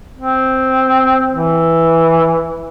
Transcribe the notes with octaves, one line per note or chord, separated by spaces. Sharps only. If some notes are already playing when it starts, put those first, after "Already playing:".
C4
E3